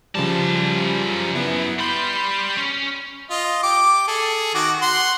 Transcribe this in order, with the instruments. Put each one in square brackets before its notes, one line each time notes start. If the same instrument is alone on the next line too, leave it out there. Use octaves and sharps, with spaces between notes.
[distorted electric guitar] F#2 A5 [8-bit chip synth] C#3 F3 G3
[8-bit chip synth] B3 E4
[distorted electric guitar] G3 B5 [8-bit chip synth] C6 G6
[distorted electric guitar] C#4
[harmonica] F4 D#5
G4 D6
G#4 A4
D#3 F#4 D6
F#5 C6